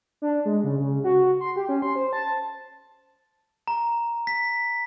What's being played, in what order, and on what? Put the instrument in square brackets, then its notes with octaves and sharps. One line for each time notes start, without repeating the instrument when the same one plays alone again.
[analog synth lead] D4
G#3
C#3
C#3
F#4
C6
G4
C#4
C6
C5
A5
[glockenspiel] A#5
B6